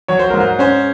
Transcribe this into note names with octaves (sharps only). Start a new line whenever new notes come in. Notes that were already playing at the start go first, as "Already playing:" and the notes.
F#3 C#5
C5
G#2 A#4
C5
C#4 C5